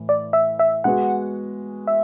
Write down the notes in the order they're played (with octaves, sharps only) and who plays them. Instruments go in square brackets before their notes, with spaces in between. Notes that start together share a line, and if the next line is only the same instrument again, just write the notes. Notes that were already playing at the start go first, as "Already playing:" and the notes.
Already playing: [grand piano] A2 E3
[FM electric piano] D5
E5
E5
[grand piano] G#3 B3 F#4 [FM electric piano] F#5
[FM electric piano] E5